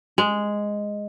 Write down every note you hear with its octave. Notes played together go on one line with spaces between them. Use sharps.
G#3